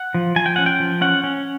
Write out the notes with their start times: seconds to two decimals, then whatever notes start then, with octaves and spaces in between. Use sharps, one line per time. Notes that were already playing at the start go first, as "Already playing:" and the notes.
Already playing: F#5
0.14 F3
0.36 F3 G#5
0.46 G5
0.56 C#4 F#5
0.66 G5
0.80 F3
1.01 C#4 F#5
1.24 C#4